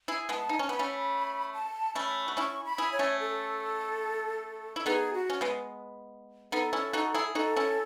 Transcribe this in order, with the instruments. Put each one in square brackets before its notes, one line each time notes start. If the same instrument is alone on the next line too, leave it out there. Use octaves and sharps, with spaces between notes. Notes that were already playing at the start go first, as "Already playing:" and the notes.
[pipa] E4 G#4
[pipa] G#3 B3 [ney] A5
[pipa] D#4
C#4
[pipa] B3 [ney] B5
[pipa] A3 C#4
[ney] A5
[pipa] A3 C#4 [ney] B5
[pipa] F#4
[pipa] C#4 E4 [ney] C#6
[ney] B5
[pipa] E4 G#4
[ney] C#5
[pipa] A3 C#4
[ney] A4
[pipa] E4
[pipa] B3 D#4 [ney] G#4 A4
[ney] F#4
[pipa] C#4
G#3 B3
[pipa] B3 D#4 [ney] A4
[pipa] C#4 E4
D#4 F#4
E4 G#4
[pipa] D#4 F#4 [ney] A4
[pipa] C#4 E4